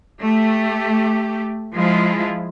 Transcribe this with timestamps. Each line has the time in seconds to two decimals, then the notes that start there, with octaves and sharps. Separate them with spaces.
0.22 A3 G4
1.74 F3 G#3 E4 F4